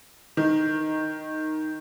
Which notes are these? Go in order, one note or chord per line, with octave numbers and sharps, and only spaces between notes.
D#3